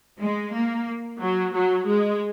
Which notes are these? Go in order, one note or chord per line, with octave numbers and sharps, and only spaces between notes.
G#3
A#3
F#3
F#3
G#3